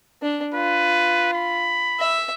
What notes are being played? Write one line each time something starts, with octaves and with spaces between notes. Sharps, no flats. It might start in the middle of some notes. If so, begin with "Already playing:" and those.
D4
F4 B4
B5
E5